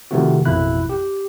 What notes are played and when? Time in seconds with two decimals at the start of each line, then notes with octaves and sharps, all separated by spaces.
0.11 C3 D#3 F3 A3 C4 F#4
0.45 A1 F2 B2 E4 F#6
0.89 G4